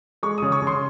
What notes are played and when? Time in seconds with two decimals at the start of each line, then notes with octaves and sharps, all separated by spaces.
0.23 G#3 C#6
0.38 C#3 D#6
0.52 C#6
0.62 C#3
0.67 C6